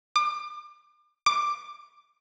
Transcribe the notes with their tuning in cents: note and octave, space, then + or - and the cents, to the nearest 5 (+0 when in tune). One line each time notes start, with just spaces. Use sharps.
D6 +35
D6 +10